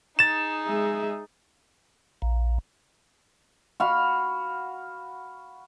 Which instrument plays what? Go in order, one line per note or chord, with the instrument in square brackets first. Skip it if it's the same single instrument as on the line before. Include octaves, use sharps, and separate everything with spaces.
[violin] D#4 G#4 [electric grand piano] A6 E7
[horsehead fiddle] G#3 E5
[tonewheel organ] A#1
[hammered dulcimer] F#4 F5 B5